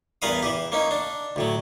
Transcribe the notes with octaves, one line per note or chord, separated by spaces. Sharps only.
E2 G2 A#4 B4 F5 D#6
E3 G4
A#3 C#4 D#4
D4
D2 A2 F#3